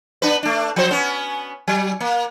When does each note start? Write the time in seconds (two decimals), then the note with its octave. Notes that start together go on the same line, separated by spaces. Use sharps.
0.22 B3 D4 B4
0.43 A3 D4
0.76 F3 C5
0.91 B3 C#4
1.68 F#3
2.00 A#3